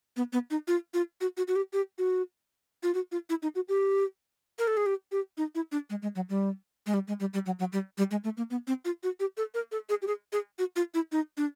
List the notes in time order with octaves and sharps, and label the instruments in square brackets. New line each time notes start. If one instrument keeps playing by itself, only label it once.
[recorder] B3
B3
D#4
F4
F4
F#4
F#4
F#4
G4
G4
F#4
F4
F#4
F4
E4
D#4
F#4
G4
A#4
A4
G#4
G4
G4
D#4
E4
D4
G#3
G#3
F#3
G3
G#3
G3
G#3
G3
G3
F#3
F#3
G3
G3
G#3
A3
A#3
B3
C4
F4
F#4
G4
A4
A#4
A4
G#4
G4
G#4
G#4
F#4
F4
E4
D#4
D4